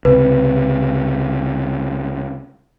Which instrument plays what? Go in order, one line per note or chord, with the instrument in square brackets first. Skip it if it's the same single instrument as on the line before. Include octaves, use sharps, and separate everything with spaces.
[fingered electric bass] C#2 C3 [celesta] B4